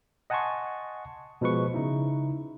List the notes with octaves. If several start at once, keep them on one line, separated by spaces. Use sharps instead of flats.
D#5 F#5 G#5 A5 C6 C#6
B2 F3 G#3 B4 C#6
C#3 D#4 E4